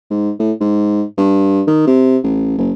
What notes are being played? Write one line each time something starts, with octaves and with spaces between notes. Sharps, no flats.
G#2
A2
G#2
G2
D#3
C3
A1
F#1